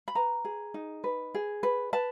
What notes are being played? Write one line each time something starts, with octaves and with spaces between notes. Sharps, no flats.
B5
B4 A#5
G#4
D#4
B4
G#4
B4
B4 A5